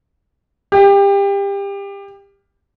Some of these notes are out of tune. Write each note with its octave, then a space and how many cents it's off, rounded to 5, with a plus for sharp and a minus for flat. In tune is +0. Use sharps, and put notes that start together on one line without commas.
G4 +25